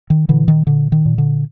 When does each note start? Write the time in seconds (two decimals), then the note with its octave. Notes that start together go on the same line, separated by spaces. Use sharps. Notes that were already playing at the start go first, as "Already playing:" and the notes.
0.10 D#3
0.28 A#2 D3 E3
0.48 D#3
0.67 A#2 D3
0.92 D#3
1.06 A#2
1.18 D3